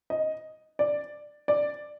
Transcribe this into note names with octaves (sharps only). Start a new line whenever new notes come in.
D#5
D5
D5